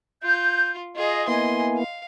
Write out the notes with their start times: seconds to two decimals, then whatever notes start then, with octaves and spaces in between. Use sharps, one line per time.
0.23 F4 G6
0.96 F4 G#4 D#5
1.28 A#3 B3 E4 D#5 G#5 C6
1.77 F5